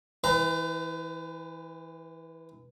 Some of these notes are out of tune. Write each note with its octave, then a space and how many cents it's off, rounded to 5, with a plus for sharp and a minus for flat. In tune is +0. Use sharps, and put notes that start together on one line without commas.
E3 -20 B4 +45 A#5 -5